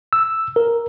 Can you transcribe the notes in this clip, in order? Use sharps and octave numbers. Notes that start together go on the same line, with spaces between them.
E6
A#4